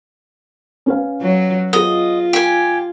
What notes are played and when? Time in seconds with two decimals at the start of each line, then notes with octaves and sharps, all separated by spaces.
0.86 C#4 B4 F5
1.22 F#3
1.73 B3 F4 G#4 D#5
2.33 G4 G#5